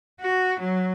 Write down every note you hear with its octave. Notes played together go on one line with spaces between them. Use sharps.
F#4
F#3